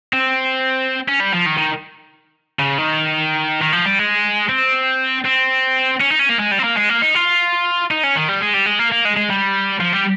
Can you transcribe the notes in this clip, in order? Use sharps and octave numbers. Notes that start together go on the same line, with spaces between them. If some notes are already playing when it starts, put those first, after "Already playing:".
C4
C#4
G3
F3
D#3
D#3
C#3
D#3
D#3
F3
G3
G#3
C4
C4
C#4
D#4
C#4
A#3
G#3
G3
C4
A#3
G#3
A#3
D#4
F4
D#4
C#4
D#3
G3
G#3
G3
G#3
A#3
A#3
G#3
G#3
G3
F3
G3